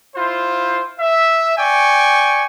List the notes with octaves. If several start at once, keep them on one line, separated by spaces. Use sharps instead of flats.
E4 F4 C5
E5
D5 G5 G#5 C#6